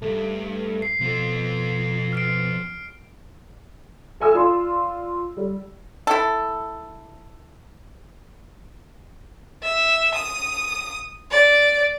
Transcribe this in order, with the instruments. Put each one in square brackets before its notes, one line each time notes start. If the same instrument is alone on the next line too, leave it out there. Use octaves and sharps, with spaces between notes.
[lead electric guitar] B1 G2 [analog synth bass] A3
[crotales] C7
[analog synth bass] B2 [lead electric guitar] F3 A4
[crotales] F6 C7 D7
[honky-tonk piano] A4 E5 G#5 D#6 E6
F4 D5 C6
G3
[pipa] E4 A4
[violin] E5
D#6
D5